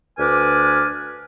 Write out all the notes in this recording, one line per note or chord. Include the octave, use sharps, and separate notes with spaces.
D2 B4 D5 G#5 F6